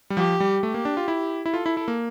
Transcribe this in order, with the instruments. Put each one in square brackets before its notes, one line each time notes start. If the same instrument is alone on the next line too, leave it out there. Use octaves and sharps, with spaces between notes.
[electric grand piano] G3
[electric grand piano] F3 [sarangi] G4
[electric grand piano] G3
[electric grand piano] A3 [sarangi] G4
[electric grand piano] A#3
D4
F4
E4
E4
[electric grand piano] F4 [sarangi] A4
[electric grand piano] E4
E4
A#3